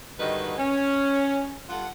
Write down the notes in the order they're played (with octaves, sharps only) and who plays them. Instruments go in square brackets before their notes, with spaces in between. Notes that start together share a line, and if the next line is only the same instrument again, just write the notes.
[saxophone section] G2 D3 D#3 F#4 B4 D#5
C#4
G2 F4 A4 F#5